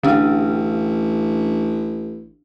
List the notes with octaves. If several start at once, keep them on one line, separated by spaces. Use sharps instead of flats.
A1 D3 C#4 D4